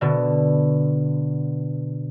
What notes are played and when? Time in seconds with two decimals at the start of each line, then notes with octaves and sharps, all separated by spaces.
0.01 B2 D3